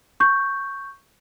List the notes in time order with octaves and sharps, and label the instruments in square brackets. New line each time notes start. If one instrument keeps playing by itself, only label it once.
[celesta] C#6 G6